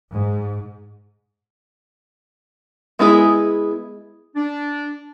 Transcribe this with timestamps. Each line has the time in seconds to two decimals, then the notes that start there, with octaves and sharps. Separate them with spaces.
0.13 G#2
2.99 G#3 B3 E4 G#4
4.35 D4